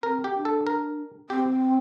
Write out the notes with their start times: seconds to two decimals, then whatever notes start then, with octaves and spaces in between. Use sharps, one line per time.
0.03 C4 A#4
0.24 G4
0.35 D4
0.45 A4
0.67 A#4
1.30 C4 G4